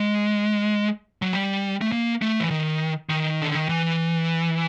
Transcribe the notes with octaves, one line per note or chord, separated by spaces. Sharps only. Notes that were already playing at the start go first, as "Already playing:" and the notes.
Already playing: G#3
F#3
G3
A3
A#3
A3
E3
D#3
D#3
D3
D#3
E3